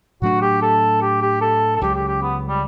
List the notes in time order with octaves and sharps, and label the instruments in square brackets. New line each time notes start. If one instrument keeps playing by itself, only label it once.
[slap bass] A2 F#3 A3 D4 [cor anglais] F#4
[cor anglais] G4
A4
G4
G4
A4
A4
[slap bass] C#2 C#3 F#3 [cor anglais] G4
[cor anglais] G4
G4
B3
G3